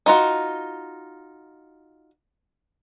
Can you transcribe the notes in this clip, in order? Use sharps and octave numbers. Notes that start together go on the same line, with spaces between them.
D#4 F4 F#4